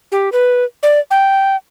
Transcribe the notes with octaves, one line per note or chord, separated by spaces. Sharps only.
G4
B4
D5
G5